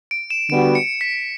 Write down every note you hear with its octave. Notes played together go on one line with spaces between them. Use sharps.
D7
E7
D3 G3 B3 F#4 D7
C#7
B6